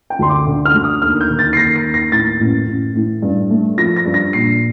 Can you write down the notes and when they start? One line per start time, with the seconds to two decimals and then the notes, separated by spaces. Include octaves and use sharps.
0.10 G5
0.19 D2 C6
0.29 D6
0.47 D3
0.65 F6
0.74 D2
0.84 D#6
1.02 D#2 F6
1.21 G6
1.30 D#3
1.39 A6
1.53 C7
1.57 D#2 A#6
1.76 C7
1.85 D#2
1.94 A#6
2.12 A2 A6
2.41 A1
2.67 A1
2.95 A2
3.22 G2
3.50 A3
3.78 F3 A#6
3.96 A#6
4.06 G2
4.14 A#6
4.33 A#1 C7